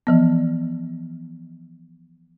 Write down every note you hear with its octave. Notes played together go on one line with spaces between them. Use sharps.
E3 F3 B3